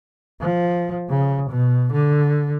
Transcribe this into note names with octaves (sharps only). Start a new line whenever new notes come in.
F3
C#3
B2
D3